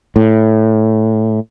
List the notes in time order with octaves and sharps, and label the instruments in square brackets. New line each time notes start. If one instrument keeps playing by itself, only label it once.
[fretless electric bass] A2